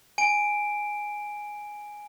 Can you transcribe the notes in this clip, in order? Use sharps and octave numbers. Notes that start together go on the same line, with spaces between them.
G#5 D7